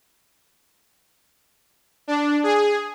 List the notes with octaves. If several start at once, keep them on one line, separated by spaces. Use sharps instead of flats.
D4
G#4